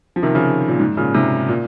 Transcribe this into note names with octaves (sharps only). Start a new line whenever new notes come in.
F3
C3 D#3
C#3 F3
A#2
G#2
A#2 C#3
G#2 C3
A#2